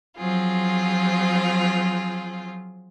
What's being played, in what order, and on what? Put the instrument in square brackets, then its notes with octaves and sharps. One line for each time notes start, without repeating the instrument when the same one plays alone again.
[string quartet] F3 F#3 C4 F4 G#4